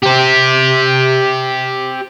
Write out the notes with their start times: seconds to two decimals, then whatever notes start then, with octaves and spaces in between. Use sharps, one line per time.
0.03 G4 C5